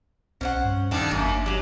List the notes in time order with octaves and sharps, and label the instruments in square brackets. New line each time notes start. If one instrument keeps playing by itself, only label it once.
[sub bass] B1 [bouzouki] C#4 C5 F#5
[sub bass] G2
[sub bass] F2 [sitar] D#3 G3 D4 [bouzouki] A4 F5 A5
[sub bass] G1 [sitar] F#2 [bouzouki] A#3
[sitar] F#3 [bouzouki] D#4 G4